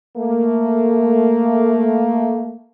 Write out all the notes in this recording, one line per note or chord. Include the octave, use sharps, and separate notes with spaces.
A3 A#3